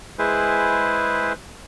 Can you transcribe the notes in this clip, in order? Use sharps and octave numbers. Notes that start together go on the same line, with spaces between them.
G#3 E4 G#4 B4 C5